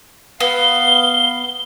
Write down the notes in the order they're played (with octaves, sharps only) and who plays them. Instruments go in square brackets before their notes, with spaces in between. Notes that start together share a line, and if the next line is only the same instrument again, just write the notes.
[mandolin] B3 [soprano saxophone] F5 [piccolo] G7